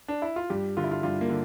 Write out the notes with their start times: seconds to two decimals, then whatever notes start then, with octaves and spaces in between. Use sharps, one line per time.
0.08 D4
0.22 E4
0.36 F4
0.50 G2 G4
0.77 D3 F4
0.84 E4
0.91 F4
1.03 G2 F4
1.21 A#3
1.30 D3